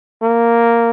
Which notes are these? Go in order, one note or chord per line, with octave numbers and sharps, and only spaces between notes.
A#3